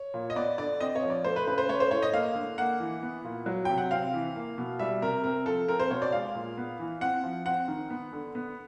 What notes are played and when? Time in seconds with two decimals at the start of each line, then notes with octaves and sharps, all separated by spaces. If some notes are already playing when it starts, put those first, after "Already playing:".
Already playing: C#5
0.14 A#2
0.30 D#5
0.36 B3 D5
0.58 D3 D5
0.80 C4 D#5
0.95 C#5
1.03 F3
1.10 D5
1.24 A3 C5
1.36 B4
1.47 C#3 B4
1.58 C5
1.69 A3 C#5
1.80 C5
1.91 A2 C#5
2.02 D#5
2.14 A#3 F5
2.35 D3
2.58 A#3 F#5
2.80 E3
3.03 B3
3.24 A#2
3.46 F#3
3.65 C3 G5
3.78 F#5
3.91 C4 F5
4.14 E3
4.36 A#3
4.58 B2
4.79 G3 E5
5.02 C3 A#4
5.24 C4 A#4
5.46 F3 A4
5.68 C4 A#4
5.80 C5
5.91 B2 C#5
6.02 D5
6.12 G#3 F5
6.35 A#2
6.57 B3
6.79 E3
7.01 C4 F#5
7.24 F3
7.46 C4 F#5
7.68 D#3
7.90 B3
8.12 D3
8.35 B3